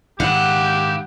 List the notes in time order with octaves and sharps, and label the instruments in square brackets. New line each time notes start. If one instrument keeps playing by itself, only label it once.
[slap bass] G#2 D#3 [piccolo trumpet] G4 [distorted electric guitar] F5 B5 [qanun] F#5